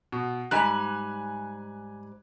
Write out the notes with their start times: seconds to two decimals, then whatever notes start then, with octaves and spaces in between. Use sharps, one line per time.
0.12 B2
0.51 G#2 G3 G#5 F#6